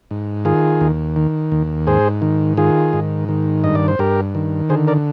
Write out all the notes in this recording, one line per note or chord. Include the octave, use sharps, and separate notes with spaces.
G#2
D#3 F4 G#4
D#2
D#3
D#2
G#2 G#4 C5
D#3
D#3 F4 G#4
G#2
D#3
G2 D#5
D5
C5
G2 G4 A#4
D#3
D3 G#4 C5
A#4 D5